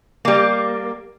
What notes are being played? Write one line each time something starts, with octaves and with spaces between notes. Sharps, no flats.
G3 A#3